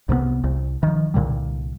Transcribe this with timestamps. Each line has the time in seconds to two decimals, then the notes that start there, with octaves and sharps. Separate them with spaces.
0.09 C2 C3 G#3 B3
0.44 C2
0.83 D#3 F3
1.14 C2 A#2 D3 G3